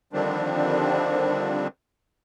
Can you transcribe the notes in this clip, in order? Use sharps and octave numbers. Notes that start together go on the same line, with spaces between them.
D3 D#3 F3 G3 C4 D4